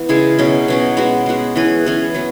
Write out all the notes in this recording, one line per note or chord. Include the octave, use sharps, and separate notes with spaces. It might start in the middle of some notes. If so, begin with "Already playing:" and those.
Already playing: E3 B3
C#3 G#3 E4 G#4
B2 F#3 C#4
B2 F#3 C#4
G#3 B3 F#4
G#3 B3 F#4
E3 C#4 G#4 B4
E3 C#4 G#4 B4
F#3 B3